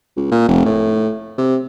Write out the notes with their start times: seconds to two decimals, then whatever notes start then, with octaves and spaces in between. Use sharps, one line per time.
0.16 C#2
0.31 A#2
0.48 F1
0.65 A2
1.38 C3